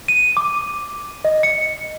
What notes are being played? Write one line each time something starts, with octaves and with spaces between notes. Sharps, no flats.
D#7
D6
D#5
C#7